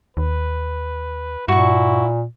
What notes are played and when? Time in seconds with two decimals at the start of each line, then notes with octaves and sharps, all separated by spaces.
0.17 D#2 B4
1.48 G2 A#2 E4 F#4 C#6